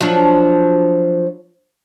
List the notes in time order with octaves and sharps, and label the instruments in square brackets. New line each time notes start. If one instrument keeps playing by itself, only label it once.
[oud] F3 F#3 D4